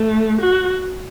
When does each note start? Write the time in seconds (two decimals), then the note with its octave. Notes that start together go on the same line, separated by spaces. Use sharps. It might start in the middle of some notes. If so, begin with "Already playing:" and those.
Already playing: A3
0.41 F#4